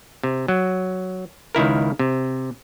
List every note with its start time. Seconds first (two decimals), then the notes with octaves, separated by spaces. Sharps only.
0.23 C3
0.48 F#3
1.55 C#2 D#3 E4 A#4
1.99 C3